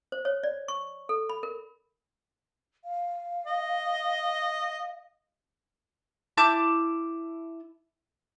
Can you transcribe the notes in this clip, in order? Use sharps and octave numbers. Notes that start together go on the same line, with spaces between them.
C5
C#5
D5
C#6
A4
B5
A#4
F5
D#5
E4 A5 D6 G6